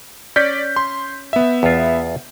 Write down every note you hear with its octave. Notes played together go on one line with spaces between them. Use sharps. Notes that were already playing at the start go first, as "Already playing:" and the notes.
C#4 D5 G6 B6
C6
B3 E5
E2 F4